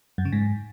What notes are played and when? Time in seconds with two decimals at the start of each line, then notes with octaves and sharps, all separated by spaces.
0.18 F#2
0.25 C#3
0.32 G#2